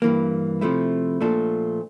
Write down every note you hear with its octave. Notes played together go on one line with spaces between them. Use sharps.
G2 E3 A#3
C3 F3 A3 E4
A#2 F3 A3 D4 A4